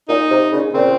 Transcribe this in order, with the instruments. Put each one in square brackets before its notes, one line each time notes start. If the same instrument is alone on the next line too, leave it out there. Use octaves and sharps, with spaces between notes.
[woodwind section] A#2 [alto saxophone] D#4
[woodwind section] C3
A#2 C#3
[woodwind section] A#2 C#3 [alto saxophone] C4